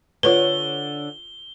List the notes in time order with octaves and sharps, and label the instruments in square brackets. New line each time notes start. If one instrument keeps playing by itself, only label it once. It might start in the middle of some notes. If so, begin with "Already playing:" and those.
[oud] D3 C#5 [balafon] F4 A4 B4 [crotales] G7